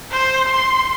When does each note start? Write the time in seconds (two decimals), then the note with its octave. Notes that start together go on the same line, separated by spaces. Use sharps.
0.11 C5
0.49 C6